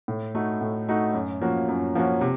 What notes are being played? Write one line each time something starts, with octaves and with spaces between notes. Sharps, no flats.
A2
A3 D#4 F#4
A2
A3 D#4 F#4
F#2
F3 A#3 C#4 F#4
F#2
F3 A#3 C#4 F#4
C3